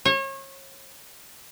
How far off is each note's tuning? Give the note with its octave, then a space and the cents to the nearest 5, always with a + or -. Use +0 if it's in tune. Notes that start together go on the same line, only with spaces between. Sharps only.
C#5 -35